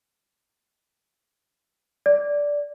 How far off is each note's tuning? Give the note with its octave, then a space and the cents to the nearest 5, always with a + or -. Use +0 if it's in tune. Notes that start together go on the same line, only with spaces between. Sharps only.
D5 -10